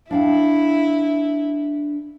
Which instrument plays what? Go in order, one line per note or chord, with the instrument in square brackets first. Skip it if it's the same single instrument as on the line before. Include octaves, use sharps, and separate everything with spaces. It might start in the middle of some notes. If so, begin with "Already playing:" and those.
[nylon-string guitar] D4 F5 G5 [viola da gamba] E4